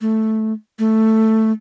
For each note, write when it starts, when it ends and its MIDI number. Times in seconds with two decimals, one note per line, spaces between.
0.01 0.53 57
0.79 1.52 57